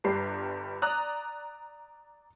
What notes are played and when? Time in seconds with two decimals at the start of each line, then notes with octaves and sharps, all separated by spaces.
0.04 G1 G2 G3 G4 C7
0.82 D5 A#5 D#6 F#6